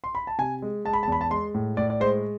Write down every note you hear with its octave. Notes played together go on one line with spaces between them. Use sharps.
C6
B5
A5
C3 G#5
G#3
G#3 A5
B5
A5
E2 B5
A5
G#3 C6
A2
A2 D5
D5
G#3 C5